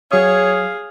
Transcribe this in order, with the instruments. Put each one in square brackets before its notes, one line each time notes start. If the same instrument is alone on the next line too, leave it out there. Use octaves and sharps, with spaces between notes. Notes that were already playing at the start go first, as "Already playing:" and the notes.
[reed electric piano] F#3 D#6 [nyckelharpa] G#4 [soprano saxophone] C#5 [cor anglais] F5